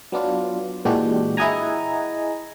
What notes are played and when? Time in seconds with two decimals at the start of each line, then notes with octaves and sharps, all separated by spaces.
0.12 F#3 B3 D4 F4
0.85 A#2 E3 G#3 D4 F#4 G4
1.37 E4 G#4 D#5 F#5 G#5 A#5